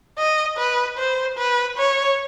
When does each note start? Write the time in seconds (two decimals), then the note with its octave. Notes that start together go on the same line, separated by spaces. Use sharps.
0.18 D#5
0.58 B4
0.97 C5
1.37 B4
1.78 C#5